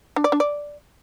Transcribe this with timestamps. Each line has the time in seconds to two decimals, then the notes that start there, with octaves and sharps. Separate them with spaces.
0.16 D4
0.24 D5
0.32 D4
0.40 D5